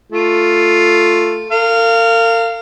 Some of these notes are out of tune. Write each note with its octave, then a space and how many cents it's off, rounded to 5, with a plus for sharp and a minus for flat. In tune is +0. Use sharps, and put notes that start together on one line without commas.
A3 +5 F4 +0
A#4 -45 F5 -15